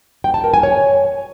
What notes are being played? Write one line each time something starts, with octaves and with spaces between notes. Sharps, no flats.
G5
A5
A#4
G#5
C#5